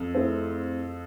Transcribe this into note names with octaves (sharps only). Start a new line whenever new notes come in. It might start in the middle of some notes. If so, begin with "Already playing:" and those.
Already playing: F2
A3 C4 E4 G#4 C5